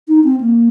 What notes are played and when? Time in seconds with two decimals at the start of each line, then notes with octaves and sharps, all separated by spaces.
0.08 D#4
0.24 C4
0.41 A#3